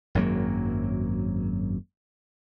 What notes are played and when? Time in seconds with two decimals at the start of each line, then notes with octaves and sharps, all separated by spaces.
0.15 G#1 F#2 F#3 A#3